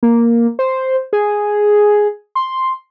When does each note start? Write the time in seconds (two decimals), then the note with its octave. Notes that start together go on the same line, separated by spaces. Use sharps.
0.03 A#3
0.59 C5
1.13 G#4
2.35 C6